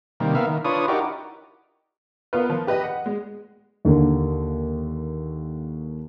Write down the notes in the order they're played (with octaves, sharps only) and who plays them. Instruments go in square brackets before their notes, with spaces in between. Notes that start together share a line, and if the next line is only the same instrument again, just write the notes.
[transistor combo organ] C3 D#3 G3 A#3
A#3 B3 E5 F5
D#3
D4 F4 B4 C#5 D#6
D#4 E4 F#4 G4 A#4 D5
[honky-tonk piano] B3 F4 A#4 B4
F3
G4 B4 D#5
F#5
G#3
[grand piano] D#2 D3 A#3